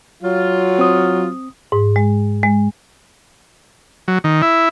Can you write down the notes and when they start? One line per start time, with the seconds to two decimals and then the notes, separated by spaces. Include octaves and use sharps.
0.23 F#3 F4
0.79 C4 D#6
1.72 G#2
1.96 G#3
2.43 G#3
4.08 F#3
4.24 D#3
4.42 E4